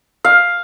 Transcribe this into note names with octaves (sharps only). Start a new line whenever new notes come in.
F5